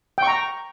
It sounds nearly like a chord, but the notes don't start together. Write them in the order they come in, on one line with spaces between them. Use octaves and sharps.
G5 C#6 A#5